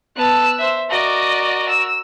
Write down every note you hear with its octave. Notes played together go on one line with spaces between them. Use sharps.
B3 A5 E6 F#6
C5 E5
F#4 A#4 D5 D#5
E6